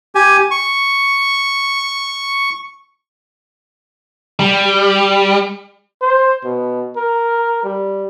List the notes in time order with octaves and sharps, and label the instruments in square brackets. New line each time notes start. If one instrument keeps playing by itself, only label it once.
[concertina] G4 G#5
C#6
[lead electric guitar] G3
[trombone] C5
B2
A#4
G3